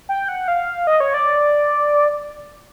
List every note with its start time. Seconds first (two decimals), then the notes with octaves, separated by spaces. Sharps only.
0.09 G5
0.28 F#5
0.48 F5
0.87 D#5
1.00 C#5
1.14 D5